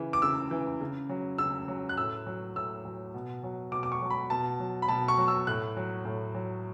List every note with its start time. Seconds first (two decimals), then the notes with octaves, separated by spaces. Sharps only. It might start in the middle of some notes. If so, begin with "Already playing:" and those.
Already playing: C#3 E3
0.13 D6
0.22 C#3 E6
0.51 E3
0.81 C#3
1.09 F#3
1.38 C#3 E6
1.68 F#3
1.89 F#6
1.97 A2 E6
2.26 F#3
2.56 A2 E6
2.85 F#3
3.14 B2
3.43 F#3
3.71 B2 D6
3.83 D6
3.92 C#6
4.01 F#3
4.10 B5
4.30 B2 A5
4.60 F#3
4.82 B5
4.88 B2 A5
5.08 C#6
5.18 F#3
5.28 E6
5.47 A2 F#6
5.77 F#3
6.05 A2
6.35 F#3